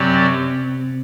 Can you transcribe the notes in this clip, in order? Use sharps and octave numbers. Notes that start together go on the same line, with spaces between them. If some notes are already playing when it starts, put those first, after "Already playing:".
Already playing: F#2 C3 F#3 C4 G4 D5